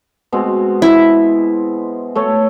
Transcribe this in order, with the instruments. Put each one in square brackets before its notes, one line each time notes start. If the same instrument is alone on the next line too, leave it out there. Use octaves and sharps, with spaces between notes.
[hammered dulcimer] B2 G#3 C4
[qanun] E4
[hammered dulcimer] A3 A4 C#5